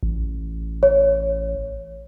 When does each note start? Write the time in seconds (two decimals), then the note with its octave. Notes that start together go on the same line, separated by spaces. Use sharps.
0.03 A1
0.83 C#5